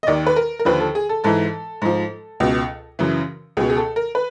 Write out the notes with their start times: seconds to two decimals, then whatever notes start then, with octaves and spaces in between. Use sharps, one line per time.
0.03 D#5
0.07 D#2 D#3 D5
0.27 B4
0.36 A#4
0.59 A#4
0.65 D#2 D3 F3 B4
0.80 A4
0.95 G#4
1.09 A4
1.24 G#2 E3 A4
1.82 G#2 F3
2.40 C#2 B2
2.99 F#2 C#3 E3
3.57 C#2 B2 G#4
3.70 G#4
3.77 A4
3.96 A#4
4.15 B4